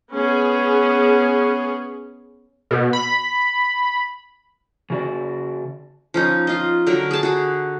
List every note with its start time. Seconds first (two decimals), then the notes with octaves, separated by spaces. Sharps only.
0.14 B3 C#4 G#4
2.71 B2
2.93 B5
4.90 C#3 F#4 D5
6.14 F3 C#4 D#4
6.47 F4 D#5
6.86 D3 F#3 A#4
7.11 G#4 A5
7.23 F#4 G#4